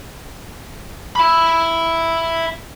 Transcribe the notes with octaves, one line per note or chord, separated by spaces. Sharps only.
E5 B5